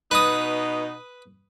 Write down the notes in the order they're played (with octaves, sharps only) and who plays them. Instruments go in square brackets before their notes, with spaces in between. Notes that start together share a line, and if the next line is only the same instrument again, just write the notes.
[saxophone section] B2 D#4 [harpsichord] B4 D#6